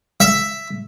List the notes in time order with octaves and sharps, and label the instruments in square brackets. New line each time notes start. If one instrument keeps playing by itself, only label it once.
[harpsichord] E5